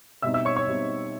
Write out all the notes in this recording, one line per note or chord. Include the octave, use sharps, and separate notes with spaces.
B2 G3 C4 D#4 E5 E6
E5 E6
C#5 C#6
C#5 C#6
B2 G3 C4 D#4